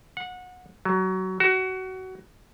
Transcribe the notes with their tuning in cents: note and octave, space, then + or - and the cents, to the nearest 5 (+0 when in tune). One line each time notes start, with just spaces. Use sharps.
F#5 -25
F#3 +20
F#4 +20